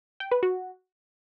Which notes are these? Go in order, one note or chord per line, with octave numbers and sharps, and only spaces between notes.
G5
B4
F#4